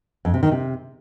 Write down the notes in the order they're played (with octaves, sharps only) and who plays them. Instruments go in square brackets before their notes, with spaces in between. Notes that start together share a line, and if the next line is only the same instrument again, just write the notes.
[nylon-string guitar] F2
C3
D#3
C3